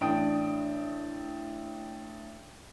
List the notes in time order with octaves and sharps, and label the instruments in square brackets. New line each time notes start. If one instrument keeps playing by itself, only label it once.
[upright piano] A1 D4 G5 D#6 D7